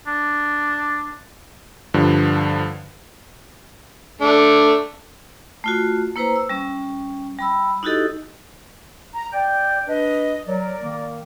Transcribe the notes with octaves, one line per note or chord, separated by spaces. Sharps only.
D4
G2 D3 F3
A3 D4
A3 F4 F#4
A#3 E4 B4 C5 A#5
E6
G3 C#4
G3 B5 E6
D#4 E4 F#4 G4 A4 D#5
A#5
D5 G5
D4 B4 D#5
F#3 A#4 D5
D#3 A#3